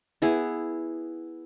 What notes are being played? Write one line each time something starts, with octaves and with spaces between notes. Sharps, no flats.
B3 E4 G#4